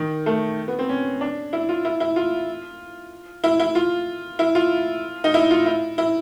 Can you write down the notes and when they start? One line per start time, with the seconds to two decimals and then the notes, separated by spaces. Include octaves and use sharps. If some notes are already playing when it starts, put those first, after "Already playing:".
Already playing: D#3
0.26 A3
0.68 B3
0.79 C4
0.89 C#4
1.21 D4
1.53 E4
1.69 F4
1.85 E4
2.00 E4
2.16 F4
3.44 E4
3.60 E4
3.75 F4
4.39 E4
4.55 F4
5.24 D#4
5.34 E4
5.51 F4
5.66 E4
5.98 E4